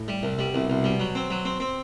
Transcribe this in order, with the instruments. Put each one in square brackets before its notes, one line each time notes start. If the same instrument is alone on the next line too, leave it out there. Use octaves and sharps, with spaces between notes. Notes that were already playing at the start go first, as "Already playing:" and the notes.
Already playing: [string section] A2
[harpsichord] G3
C2
[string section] B2 [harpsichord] G3
[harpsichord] C2
C2
G3
F#3
C4
F#3
C4
C4